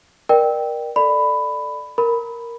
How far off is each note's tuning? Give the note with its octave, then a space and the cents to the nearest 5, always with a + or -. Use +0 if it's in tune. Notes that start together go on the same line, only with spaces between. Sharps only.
A#4 +20 D5 +35 G5 +0
A4 +0 D5 +15 B5 +10
A#4 +0 B5 +0